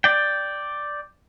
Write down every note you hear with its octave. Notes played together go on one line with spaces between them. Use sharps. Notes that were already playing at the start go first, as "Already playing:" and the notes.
D5 G5